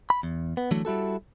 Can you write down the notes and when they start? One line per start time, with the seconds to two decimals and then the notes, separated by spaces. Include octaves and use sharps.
0.10 B5
0.23 E2
0.57 B3
0.71 D3 E3 F#3 A3
0.85 G3 E4 F#4 A4